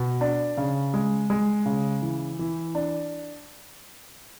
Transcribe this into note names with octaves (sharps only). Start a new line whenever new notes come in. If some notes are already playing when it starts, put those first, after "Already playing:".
Already playing: B2
D4
C#3
G#3
G#3
C#3
E3
E3
D4